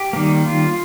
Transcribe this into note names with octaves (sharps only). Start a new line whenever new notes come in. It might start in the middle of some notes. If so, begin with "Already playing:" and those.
Already playing: G4
D#3 G3 A#3
F4